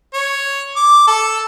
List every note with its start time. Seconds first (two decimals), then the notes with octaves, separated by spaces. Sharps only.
0.14 C#5
0.76 D6
1.07 A4